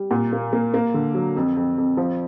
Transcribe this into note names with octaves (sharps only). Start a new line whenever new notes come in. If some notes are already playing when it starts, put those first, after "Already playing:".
Already playing: G3
A#2
A#3
A#3
A#3
D3
F#3
F2
F2
F2
F3